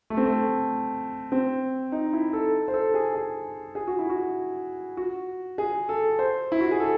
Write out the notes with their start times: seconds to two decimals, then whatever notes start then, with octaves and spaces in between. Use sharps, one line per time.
0.10 A3
0.17 C4
0.26 A3
1.32 C4
1.92 D#4
2.13 E4
2.33 A4
2.68 C5
2.74 A4
2.94 G#4
3.15 G#4
3.75 G#4
3.87 F#4
3.99 E4
4.10 F#4
4.97 F#4
5.58 G#4
5.89 A4
6.19 C5
6.52 E4
6.61 F#4
6.71 G#4
6.80 A4